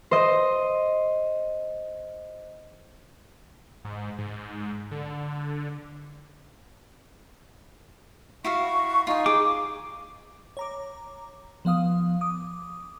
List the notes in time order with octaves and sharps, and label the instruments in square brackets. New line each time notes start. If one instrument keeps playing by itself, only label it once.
[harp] C5 D#5
[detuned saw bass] G#2
G#2
D3
[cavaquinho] E4 F#4 F5 [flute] C#6
[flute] D#4 [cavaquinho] F4 G#5
[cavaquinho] G#4 [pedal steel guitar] D6
[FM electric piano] C#5 A#5 D6
F3 B3 F5 D#6
D6 D#6